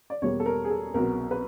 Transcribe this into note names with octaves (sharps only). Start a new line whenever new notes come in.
D5
E2 B2 G3 A#3 C#5
A4
A#4
G#4
A4
C2 B2 F#3 B3 A#4
B4